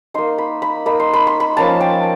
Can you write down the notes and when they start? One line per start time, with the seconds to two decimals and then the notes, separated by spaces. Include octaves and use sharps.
0.14 A#3 D#4 C6
0.38 B5
0.62 B5
0.86 A#3 D#4 B5
1.00 C6
1.14 B5
1.27 C6
1.40 B5
1.57 F3 A#3 C#4 A5
1.81 G5